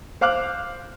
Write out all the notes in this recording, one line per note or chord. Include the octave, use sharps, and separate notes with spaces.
C5 F5 D6 F6 F#6